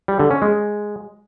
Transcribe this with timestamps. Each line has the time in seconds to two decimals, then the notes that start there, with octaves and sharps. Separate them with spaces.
0.08 G3
0.19 D3
0.31 C#4
0.42 G#3